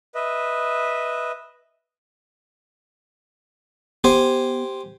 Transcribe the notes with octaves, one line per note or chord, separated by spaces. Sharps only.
B4 D#5 E5
B3 G4 C5 G#5